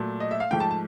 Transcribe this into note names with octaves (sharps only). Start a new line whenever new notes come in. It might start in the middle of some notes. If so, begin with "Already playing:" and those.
Already playing: A#2 F#3 A3
D#5
E5
F5
G#2 F3 A3 G5
A5
A5